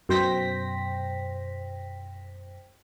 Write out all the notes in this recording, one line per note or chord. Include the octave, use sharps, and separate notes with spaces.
F#2 B2 C5 G5 A#6 B6